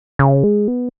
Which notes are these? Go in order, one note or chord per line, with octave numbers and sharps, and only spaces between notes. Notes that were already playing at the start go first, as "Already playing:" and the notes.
C#3
G#3
B3